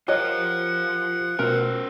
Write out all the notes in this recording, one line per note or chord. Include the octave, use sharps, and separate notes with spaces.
F4 G4 A#4 C5 C#5 D#5 F#5
B2 A3 C#4 F4 A#4 C5